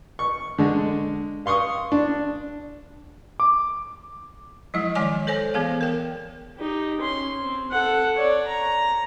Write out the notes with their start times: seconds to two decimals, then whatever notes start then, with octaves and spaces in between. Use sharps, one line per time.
0.19 C#6
0.58 D3 G#3
1.46 F5 C6 C#6 D#6
1.92 D4
3.40 D6
4.74 F3 F#3 G#3 E4 D#5
4.95 D#3 G#3 C#5 D5 G#5 D6
5.27 A4 C5 C#5 G#5
5.54 E3 B3 G#4 F5
5.81 A#4 G5
6.57 D#4 G4
7.01 C#4 C6
7.41 C4
7.71 A4 F#5
8.16 C#5 D5
8.47 A#5